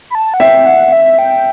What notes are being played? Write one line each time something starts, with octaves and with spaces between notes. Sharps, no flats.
B5
A5
F#5
E5 G5
F#5
E5
G5